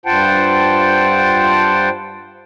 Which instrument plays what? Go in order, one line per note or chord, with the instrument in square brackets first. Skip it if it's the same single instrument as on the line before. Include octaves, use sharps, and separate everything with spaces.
[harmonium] G2 F4 C5 F#5 G5 A5